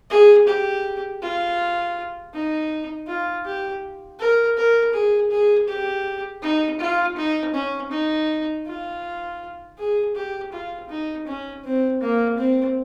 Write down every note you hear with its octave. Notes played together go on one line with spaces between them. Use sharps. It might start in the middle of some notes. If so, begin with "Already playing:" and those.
G#4
G4
F4
D#4
F4
G4
A#4
A#4
G#4
G#4
G4
D#4
F4
D#4
C#4
D#4
F4
G#4
G4
F4
D#4
C#4
C4
A#3
C4